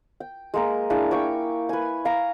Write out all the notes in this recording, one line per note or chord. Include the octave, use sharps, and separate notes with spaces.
G5
G#3 A#3 A#4
D4 E4 G#4 F5
G5 G#5 C#6 D6
B4 G#5
F5 A#5